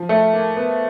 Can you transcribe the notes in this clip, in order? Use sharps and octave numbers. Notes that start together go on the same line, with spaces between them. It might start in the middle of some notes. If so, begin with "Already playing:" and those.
Already playing: F3
A3
A#3
B3